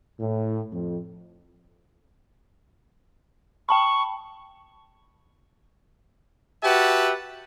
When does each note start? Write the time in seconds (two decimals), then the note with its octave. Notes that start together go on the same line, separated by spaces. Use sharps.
0.20 A2
0.71 F2
3.69 G5 A5 B5 C#6
6.63 F#4 G4 B4 E5 F#5 A5